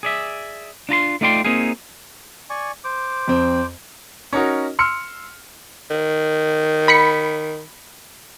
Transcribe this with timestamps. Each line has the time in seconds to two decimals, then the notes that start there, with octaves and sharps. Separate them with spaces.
0.03 G#4 D5 E5
0.89 D4 F4 A#5 C6
1.21 A3 D#4 F4 D5 G5 C6
1.45 A#3 C4 D#4 F4 G#4
2.50 D5 G#5 C#6
2.84 C5 D6
3.28 F2 C4
4.33 C#4 D#4 F#4 A#4
4.79 C6 E6 F6 C#7
5.91 D#3
6.88 B5 B6 C#7